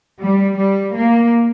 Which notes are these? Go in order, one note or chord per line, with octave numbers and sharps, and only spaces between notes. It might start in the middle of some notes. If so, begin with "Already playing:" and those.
G3
G3
A#3